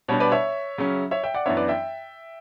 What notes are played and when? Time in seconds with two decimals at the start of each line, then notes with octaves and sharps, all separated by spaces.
0.08 B2 G3 B3 D4 C#5
0.20 B4 D5
0.32 C#5 E5
0.78 C#3 F#3 C#4
1.11 C#5 E5
1.23 E5 G5
1.34 D5 F#5
1.46 F#2 E3 B3 D4 C#5 E5
1.57 B4 D5
1.68 E5 G5